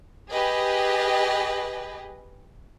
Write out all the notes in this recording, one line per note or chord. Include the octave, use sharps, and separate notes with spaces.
G4 G#4 B4 D#5